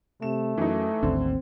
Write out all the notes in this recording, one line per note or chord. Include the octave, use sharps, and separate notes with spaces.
C3 A3 E7
F#2 E3 D#4
A1 D#2 D3 C4